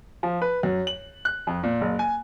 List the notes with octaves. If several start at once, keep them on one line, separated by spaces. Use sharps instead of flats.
F3
B4
F#2
F#7
F#6
F2
A#2
F#1
G#5